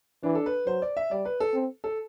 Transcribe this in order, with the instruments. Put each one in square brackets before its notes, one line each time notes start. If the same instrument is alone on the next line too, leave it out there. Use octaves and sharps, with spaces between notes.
[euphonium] E3 [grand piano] D4
[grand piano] A4
B4
[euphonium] F#3 [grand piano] C5
[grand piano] D5
E5
[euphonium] G3 [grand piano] D5
[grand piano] B4
A4
[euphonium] C4
[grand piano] A4